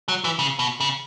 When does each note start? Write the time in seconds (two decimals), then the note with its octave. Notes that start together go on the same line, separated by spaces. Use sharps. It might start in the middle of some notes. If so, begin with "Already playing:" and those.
0.08 F#3
0.24 E3
0.39 C#3
0.59 B2
0.80 C#3